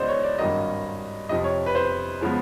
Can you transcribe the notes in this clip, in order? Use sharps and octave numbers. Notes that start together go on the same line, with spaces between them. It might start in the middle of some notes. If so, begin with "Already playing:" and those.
Already playing: C#2 C#3 F#3 B3 C5 D5 D#5
C#5
D5
G#1 G2 D#3 F#3 A#3 D#5
F2 C3 F3 D#5
C#5
B4
C5
C#3 F3 G#3 B3